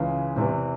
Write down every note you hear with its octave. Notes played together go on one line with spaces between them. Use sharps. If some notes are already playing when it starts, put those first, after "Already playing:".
Already playing: C#2 C#3 E3 G#3
E2 C3 E3